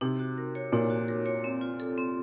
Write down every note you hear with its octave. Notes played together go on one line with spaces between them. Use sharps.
C3 D#4
F#4
A#4
C#5
A#2 D#4
F#4
A#4
C#5
C4
F4
A4
C4